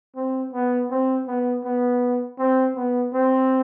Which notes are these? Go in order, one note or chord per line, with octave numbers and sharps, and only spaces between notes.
C4
B3
C4
B3
B3
C4
B3
C4